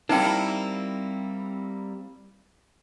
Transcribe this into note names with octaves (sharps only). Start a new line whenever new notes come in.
G3 A#3 C4 D#4 E4 G5